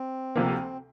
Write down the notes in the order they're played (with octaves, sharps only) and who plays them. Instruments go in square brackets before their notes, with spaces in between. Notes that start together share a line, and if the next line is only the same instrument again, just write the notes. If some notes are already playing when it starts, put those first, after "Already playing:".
Already playing: [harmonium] C4
[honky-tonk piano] D2 C3 F3 A#3